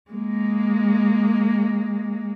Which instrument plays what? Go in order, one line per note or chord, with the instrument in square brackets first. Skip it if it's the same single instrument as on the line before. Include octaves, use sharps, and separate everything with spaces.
[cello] G#3 A#3